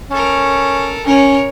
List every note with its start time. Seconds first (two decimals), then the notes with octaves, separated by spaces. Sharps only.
0.11 C#4 A4 A#4
1.06 C#4 A#4 C#5